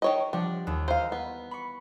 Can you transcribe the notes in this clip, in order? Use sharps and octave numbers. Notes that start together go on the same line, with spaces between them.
D#3 C#5 D#5
F3 G3 D4 F#5
D#2
E4 C5 F5 A#5 D#7
B3
B5 C#6